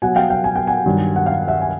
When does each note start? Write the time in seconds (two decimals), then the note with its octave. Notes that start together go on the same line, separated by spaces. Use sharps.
0.02 B2 F#3 F#5 G#5
0.16 F5 G5
0.30 F5 G5
0.44 G#5
0.56 G5
0.67 F#5 G#5
0.86 G2 D#3 F#3
1.16 F#5
1.26 F5 G5
1.48 E5 F#5
1.61 G#5